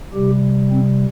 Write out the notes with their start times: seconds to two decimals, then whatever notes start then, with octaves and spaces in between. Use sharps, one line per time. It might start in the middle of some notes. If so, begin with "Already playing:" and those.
0.13 C3 G3 G4
0.71 C4